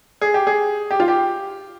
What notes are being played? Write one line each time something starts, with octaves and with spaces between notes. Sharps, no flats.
G#4
G4
G#4
G4
F4
G4